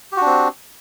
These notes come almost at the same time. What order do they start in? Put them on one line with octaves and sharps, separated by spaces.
G4 F#4 D4 C4